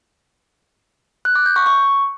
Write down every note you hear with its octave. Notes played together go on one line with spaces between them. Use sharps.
F#6
D6
G6
C#6
C#6